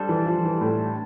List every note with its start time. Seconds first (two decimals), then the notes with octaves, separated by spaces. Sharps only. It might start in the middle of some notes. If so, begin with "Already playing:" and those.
Already playing: G3 D4 A4 C5
0.09 E3
0.26 F3
0.45 E3
0.61 A2